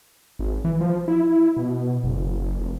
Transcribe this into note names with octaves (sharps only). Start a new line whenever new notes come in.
G#1
E3
F3
E4
B2
F#1
F1